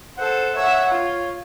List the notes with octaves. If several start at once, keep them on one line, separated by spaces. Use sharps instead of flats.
A4 C5 F#5
C#5 E5 F#5
F4